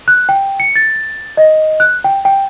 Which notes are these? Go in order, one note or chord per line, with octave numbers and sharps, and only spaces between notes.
F#6
G5
C#7
A6
D#5
F#6
G5
G5